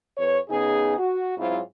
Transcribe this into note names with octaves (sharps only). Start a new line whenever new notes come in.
F2 B4 C#5
C#3 B3 D#4 G#4
F#4
G#2 F#3 C4 E4 F4